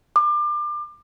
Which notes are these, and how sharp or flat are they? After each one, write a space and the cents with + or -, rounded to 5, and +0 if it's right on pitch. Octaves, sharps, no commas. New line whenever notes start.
D6 +30